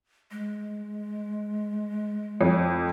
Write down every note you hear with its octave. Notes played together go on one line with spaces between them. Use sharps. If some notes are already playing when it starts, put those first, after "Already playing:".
G#3
F2